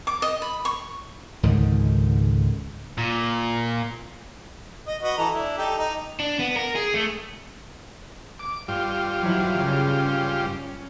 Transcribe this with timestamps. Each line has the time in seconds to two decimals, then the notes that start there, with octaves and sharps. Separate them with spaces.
0.07 D6
0.22 D#5
0.42 B5
0.65 C#6
1.43 C#2 G#2 D3 D#3
2.98 A#2
4.87 D#5
5.02 F#4 B4 D#5
5.18 E3 A4 A#5
5.34 D4 E4
5.58 D#4 G4 A4
5.78 D#4
6.20 D4
6.39 B3
6.56 A#4
6.76 G#4
6.94 A3
8.39 D6
8.68 G2 G3 F4
9.23 F3 F#3 E4
9.56 C#3
10.00 C#4